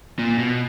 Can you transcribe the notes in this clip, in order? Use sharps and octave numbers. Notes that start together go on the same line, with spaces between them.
A#2
B2